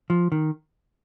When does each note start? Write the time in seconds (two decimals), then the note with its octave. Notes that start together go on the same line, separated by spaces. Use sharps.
0.10 F3
0.32 D#3